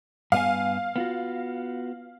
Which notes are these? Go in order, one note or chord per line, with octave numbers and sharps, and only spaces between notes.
G2 B3 F5 G#5
B3 F4 F#4